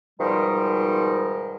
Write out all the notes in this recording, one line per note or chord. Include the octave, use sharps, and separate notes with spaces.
G#2 B2 D#3 F3 G3